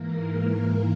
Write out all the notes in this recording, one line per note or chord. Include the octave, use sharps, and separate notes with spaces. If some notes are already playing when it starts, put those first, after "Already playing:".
Already playing: G#2 E3 A#3 A#4
A#4